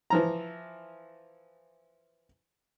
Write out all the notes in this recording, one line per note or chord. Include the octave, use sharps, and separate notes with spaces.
E3 F3 A#5